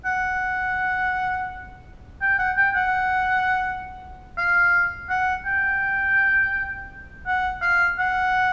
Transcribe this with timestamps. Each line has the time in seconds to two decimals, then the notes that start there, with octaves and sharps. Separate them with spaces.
0.05 F#5
2.22 G5
2.39 F#5
2.57 G5
2.75 F#5
4.38 F5
5.10 F#5
5.46 G5
7.27 F#5
7.62 F5
7.99 F#5